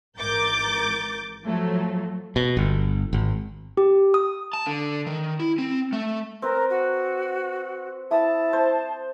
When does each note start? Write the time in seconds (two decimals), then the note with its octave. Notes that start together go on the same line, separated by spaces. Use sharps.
0.18 G#1 E3 A#4 D6 G6 A6
1.45 F3 F#3 A3
2.36 B2
2.57 G1
3.13 G#1
3.77 G4
4.14 D#6
4.53 A5
4.67 D3
5.07 D#3
5.40 E4
5.58 C4
5.93 A3
6.42 C4 A#4 B4
6.70 F#4
8.11 E4 A5 D#6
8.53 C5